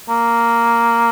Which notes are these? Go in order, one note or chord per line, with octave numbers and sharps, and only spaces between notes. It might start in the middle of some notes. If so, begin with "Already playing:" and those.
A#3